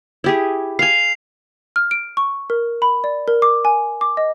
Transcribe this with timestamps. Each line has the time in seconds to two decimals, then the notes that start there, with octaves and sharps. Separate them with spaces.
0.24 E4 G4 G#4
0.79 F5 G#5 C7 F7
1.76 F6
1.91 D7
2.17 C#6
2.50 A#4
2.82 B5
3.04 D5
3.28 A#4
3.42 D6
3.65 G#5
4.01 D6
4.17 D#5